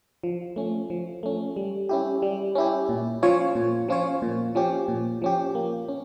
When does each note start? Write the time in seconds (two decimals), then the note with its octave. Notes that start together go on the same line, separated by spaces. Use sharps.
0.23 F3
0.56 A3 C#4
0.90 F3
1.23 A3 C#4
1.56 G3
1.89 C#4 E4 G4
2.22 G3
2.55 C#4 E4 G4
2.89 A#2
3.22 F3 C#4 F4 C#5
3.55 A#2
3.89 F3 C#4 F4 C#5
4.22 A#2
4.55 F3 C#4 G4
4.88 A#2
5.22 F3 C#4 G4
5.55 A#3
5.88 C#4